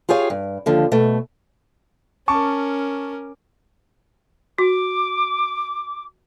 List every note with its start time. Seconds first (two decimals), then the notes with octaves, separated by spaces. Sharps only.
0.09 F4 G4 G#4 C#5 F5
0.30 G2
0.66 D#2 D3 F3
0.92 B2 A3
2.28 C#4 A#4 A5 C#6 D6
4.58 F#4 D6